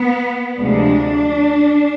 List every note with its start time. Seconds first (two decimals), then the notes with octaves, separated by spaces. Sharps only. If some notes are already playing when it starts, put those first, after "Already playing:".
Already playing: B3
0.59 D2 C3 F3 G#3 D4